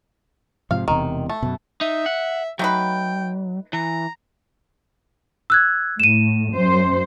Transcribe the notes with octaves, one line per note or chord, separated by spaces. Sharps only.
G#2 C3 F3 F5
E1 E2 C3 D#3
A3
F#2 B2
D#4 E5
F#5
F#3 A3 D#4 B4 G5
E3 A#5
E6 F#6 G#6
A2 D#7 E7
F#2 C5